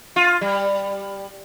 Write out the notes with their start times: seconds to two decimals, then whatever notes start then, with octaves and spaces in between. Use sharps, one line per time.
0.16 F4
0.41 G3